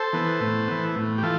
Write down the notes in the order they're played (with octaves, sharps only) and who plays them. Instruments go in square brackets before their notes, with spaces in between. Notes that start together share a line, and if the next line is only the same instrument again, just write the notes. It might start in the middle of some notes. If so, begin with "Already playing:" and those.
Already playing: [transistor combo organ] A4 C5
E3 B3
A2
E3 B3
A2
G4
E3 F4 A4